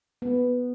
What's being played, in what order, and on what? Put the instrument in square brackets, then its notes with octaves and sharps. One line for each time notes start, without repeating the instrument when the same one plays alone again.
[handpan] B3